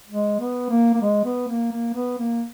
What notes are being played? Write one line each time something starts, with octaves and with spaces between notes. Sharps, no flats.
G#3
B3
A#3
A#3
G#3
B3
A#3
A#3
B3
A#3